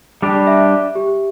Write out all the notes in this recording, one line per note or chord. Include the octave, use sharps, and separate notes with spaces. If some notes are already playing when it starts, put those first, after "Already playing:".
G3 D4 G4
E5
G4